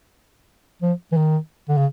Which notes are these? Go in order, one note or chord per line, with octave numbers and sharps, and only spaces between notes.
F3
E3
D#3
D3
C#3